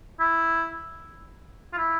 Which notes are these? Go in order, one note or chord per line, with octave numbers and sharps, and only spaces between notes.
E4
F4
E4